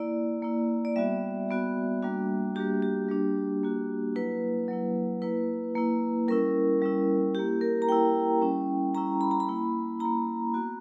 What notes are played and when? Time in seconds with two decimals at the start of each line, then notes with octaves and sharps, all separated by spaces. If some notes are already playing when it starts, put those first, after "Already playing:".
Already playing: A#3 E4 D5
0.43 A#3 E4
0.85 D5
0.96 G3 B3 F#4 E5
1.49 G3 B3 F#4
2.02 G3 A#3 D4 F#4
2.55 G3 A#3 D4 F#4 G4
2.82 G4
3.08 G3 A#3 D4 F#4
3.63 G3 A#3 D4 F#4
4.16 F#3 A#3 E4 B4
4.68 F#3 A#3 E4
5.22 A#3 E4 B4
5.75 A#3 E4
6.28 G3 C#4 E4 A#4
6.82 G3 C#4 E4
7.35 A#3 E4 G4
7.61 A#4
7.82 A#5
7.88 A#3 E4 G5
8.42 G3 C#4 E4
8.94 G3 C#4 E4 A#5
9.21 B5
9.31 A#5
9.40 B5
9.48 A#3 E4
10.00 A#3 E4 A#5
10.54 B3 F#4